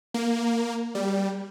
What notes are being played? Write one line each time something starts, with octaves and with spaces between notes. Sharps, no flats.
A#3
G3